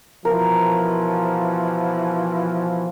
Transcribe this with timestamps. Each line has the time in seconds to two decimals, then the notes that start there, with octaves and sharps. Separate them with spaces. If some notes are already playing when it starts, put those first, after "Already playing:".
0.25 B2 E3 F3 A#4